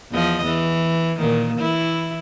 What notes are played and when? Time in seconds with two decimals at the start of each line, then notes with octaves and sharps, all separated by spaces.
0.11 E2 F3 D#5
0.45 E3
1.19 A#2 D#3
1.60 E3 E4